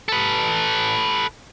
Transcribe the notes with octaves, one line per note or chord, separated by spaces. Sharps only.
A4 B4